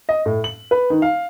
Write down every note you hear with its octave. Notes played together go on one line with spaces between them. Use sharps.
D#5
A2
F#7
B4
D#3
F5